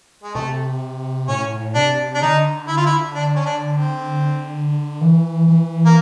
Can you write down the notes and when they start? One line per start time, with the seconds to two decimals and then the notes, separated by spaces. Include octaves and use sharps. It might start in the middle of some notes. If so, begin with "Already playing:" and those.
0.23 G#3
0.35 C3 A3
1.28 A2 C#4
1.75 C3 D4
2.15 D4
2.22 D3 D#4
2.68 E4
2.77 F4
2.86 E4
3.15 D4
3.36 C#4
3.46 D4
3.77 C4
5.01 E3
5.48 E3
5.86 A#3